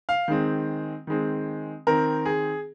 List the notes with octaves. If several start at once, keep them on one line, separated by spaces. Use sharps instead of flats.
F5
D#3 G#3 C4
D#3 G#3 C4
D#3 C4 A#4
G#4